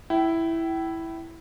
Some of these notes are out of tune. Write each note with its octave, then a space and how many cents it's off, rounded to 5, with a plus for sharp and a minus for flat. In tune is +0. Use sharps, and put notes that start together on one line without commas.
E4 +0 G5 -30